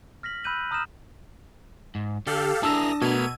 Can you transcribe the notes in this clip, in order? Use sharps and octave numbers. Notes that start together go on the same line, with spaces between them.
F6 A#6 B6 F#7
B5 E6 F#6 G6 D#7 F#7
A#5 D#6 F6 G6 A#6 E7
G#2
D3 G4 A4 F5
D4 E4 G#4 A#4 A5 D#6 E6 A#6
B2 A3 B3 A#4 G#6 D#7